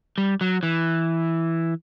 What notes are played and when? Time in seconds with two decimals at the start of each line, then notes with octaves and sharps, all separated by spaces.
0.18 G3
0.41 F#3
0.63 E3